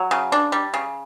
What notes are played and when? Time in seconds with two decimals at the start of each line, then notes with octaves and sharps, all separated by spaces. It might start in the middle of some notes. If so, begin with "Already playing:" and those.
Already playing: F#3
0.11 C#3
0.32 D4
0.52 G3
0.74 C#3